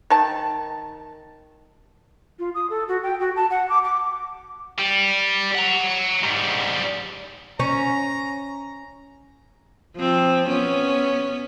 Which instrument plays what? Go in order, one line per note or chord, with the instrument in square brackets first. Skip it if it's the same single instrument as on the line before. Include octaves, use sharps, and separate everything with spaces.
[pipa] D#3 A5
[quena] F4
D#6
A4
F#4
G5
F#4
A5
F#5
D6
D6
[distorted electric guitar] G3
F#5 A#5
G#2 G3
[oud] C#4 [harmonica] A#5
[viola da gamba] F3 C4
B3 C#4